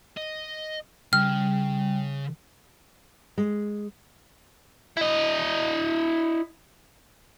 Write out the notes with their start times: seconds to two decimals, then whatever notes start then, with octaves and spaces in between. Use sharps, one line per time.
0.17 D#5
1.13 C#3 G3 F6
3.38 G#3
4.97 E4 D#5